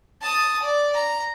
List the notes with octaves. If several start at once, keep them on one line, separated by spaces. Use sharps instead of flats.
A5 D#6
D5
A#5